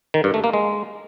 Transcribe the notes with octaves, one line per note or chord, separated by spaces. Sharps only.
D#3
G2
A3
A#3
G#3